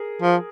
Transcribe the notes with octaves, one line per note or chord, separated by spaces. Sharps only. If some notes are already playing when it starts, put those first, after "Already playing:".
Already playing: G#4 A#4
F3